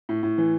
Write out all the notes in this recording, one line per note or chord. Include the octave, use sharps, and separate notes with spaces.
A2
A2
E3